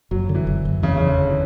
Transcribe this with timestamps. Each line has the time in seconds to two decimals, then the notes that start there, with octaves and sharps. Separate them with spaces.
0.11 F#1 F#3
0.29 D3
0.35 E3
0.47 F#1
0.65 F#1
0.83 E2 C#3
0.97 E2 C#3
1.07 D3
1.18 D3
1.30 E3